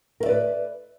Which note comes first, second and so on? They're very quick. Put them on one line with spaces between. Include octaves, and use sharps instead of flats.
A#4 E5 D5 B4